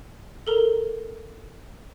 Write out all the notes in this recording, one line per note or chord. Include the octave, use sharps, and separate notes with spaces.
A4 A#4 A#5